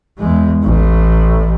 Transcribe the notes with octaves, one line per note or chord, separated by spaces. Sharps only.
E2 G#3
A1 A2